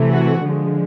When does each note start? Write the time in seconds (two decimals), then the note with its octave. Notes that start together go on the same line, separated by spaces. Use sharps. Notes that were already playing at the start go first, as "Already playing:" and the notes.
Already playing: C3 E3 A3
0.12 F#4
0.43 D3 F3 G#3